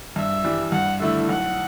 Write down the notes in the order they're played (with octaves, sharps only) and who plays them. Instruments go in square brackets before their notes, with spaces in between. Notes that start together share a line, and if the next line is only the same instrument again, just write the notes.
[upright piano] G2 [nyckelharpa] E5
[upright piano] E3 G3
[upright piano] G2 [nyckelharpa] F#5
[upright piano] D3 A3 E4 [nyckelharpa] E5
[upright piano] B1 [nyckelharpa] F#5